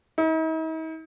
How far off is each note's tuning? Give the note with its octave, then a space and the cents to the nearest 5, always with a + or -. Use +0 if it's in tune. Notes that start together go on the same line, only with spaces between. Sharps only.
D#4 +45